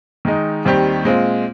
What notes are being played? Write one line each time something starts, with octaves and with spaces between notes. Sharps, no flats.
D#3 G#3 D#4
D#2 D#3 G3 C4 G4
A#2 G#3 C4 F4